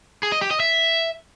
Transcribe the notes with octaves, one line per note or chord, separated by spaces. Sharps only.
G#4
D#5
G4
D#5
E5